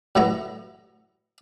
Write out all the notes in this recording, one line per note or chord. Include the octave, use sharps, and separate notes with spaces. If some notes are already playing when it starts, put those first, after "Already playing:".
A2 F#3 B3 E4 A#5